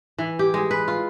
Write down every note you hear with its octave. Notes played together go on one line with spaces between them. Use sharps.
E3
G4
G#3
B4
F4